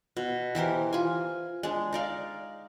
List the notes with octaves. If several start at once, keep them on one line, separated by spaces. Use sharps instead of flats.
B2
E3 G4 A#4 C5
F4 G#5
G#3 D4
D#4 D5 F5